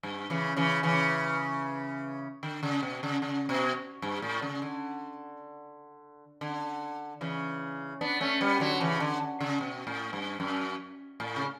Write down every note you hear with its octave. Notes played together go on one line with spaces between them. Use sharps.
G2
C#3 E3
C#3 E3
C#3 E3
D3
C#3
B2
C#3
C#3
B2
G2
A2
C#3
D3
D3
C#3 E3
B3 D4
A3 C#4
G3 B3
D3 F#3
C#3 E3
D3
C#3
B2
A2
G2
F#2
A2
C#3